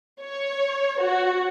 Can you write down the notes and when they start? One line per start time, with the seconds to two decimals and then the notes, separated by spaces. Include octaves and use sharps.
0.20 C#5
1.00 F#4